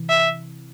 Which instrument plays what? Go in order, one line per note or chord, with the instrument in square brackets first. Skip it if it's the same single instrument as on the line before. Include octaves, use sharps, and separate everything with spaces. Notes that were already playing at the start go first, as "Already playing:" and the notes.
Already playing: [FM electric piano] C3 E3
[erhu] E5